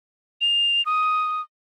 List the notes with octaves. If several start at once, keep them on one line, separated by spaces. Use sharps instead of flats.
F7
D#6